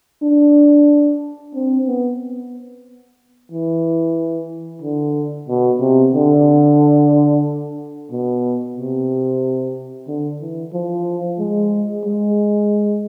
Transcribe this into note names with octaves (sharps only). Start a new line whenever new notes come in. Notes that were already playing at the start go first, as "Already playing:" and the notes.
D4
C4
B3
E3
D3
B2
C3
D3
B2
C3
D3
E3
F3
G#3
G#3